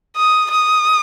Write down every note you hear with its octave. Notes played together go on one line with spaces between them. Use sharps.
D#6
D#6